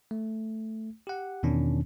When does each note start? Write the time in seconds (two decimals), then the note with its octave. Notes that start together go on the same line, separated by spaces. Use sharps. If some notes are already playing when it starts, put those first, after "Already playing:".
0.11 A3
1.07 G4 F#5
1.43 E2 B2 D#3 C#4 D4